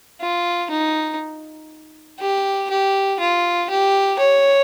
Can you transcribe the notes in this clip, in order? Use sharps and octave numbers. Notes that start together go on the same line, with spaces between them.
F4
D#4
G4
G4
F4
G4
C#5